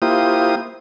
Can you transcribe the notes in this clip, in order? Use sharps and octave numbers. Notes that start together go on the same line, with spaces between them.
A#3 E4 F4 G4 C5 D#6